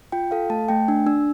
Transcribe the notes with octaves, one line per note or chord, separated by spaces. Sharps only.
F4 G5
A4 F5
A3 A5
A3 G5
D4
D4 E6